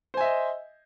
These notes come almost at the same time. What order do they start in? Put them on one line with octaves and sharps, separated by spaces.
C5 G#5 E5 D#5